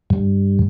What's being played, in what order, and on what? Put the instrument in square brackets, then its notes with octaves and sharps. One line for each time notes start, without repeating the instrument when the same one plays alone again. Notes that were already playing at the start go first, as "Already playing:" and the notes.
[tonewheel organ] G2